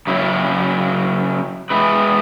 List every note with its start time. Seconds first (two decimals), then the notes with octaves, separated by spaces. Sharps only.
0.07 C#3 F#3 C#4 E4
1.70 G#3 B3 E4 B4